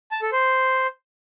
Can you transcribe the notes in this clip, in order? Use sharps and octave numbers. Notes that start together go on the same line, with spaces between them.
A5
A4
C5